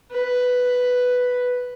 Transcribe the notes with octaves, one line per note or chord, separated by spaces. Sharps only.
B4